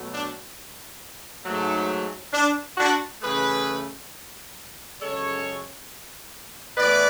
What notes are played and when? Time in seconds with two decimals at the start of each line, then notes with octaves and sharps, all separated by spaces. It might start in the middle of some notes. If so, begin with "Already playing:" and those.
Already playing: B2 F#3 A3
0.11 D4
1.44 G#2 F#3 A3
2.33 D4
2.77 D4 F#4
3.22 C#3 E3 A3 G#4 B4
5.00 F#2 C#3 G#3 A4 C#5
6.77 A2 E3 B3 B4 D5